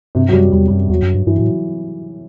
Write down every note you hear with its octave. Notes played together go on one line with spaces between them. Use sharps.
G2 C3
F#3
F#2 G3
F#3
E2 G3
G3
F#2
E2 F#3
F#2
G2
G2 E3
A2 F#3